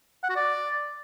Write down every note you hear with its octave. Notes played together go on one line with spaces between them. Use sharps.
F#5
F#4
D5